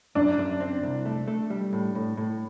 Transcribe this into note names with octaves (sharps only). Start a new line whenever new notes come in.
F#2 D4
F#2
C4
C2
A3
A3
G3
A2
A2
A2